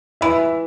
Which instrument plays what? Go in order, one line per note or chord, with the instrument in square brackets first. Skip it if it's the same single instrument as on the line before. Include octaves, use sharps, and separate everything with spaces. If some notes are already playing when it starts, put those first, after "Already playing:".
[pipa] E3 [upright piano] E5